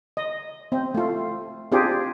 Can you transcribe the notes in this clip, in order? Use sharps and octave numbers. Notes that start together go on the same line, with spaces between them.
D#5
C4
A3 F4
C4 D4 F4 G4 G#4